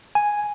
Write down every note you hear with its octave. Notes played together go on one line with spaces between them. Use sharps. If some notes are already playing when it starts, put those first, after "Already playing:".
G#5